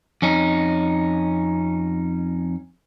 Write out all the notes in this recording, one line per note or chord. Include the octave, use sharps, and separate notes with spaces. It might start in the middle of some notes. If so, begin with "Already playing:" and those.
F2 C#4 D#4